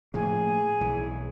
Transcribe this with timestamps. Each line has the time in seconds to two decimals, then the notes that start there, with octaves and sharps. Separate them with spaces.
0.14 A2 F3 A#3 G#4
0.81 B1 E3